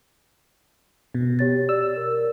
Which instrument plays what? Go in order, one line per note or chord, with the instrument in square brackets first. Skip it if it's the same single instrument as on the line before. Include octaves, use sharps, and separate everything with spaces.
[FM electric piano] B2
[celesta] G4 C#5 A6
[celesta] D5 [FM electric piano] E6
[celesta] A#4